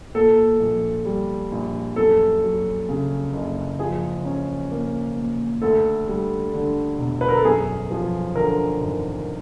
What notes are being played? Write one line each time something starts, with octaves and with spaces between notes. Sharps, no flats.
A#2 A4
A#1
G3
A#1
F#2 A4
F#3
C#3
F#1
F3 G#4
C#4
A#3
A#2
D2 A4
G3
D3
E1
B4
A#4
A4
F#2 G#4
F3
D3 A#4
G#1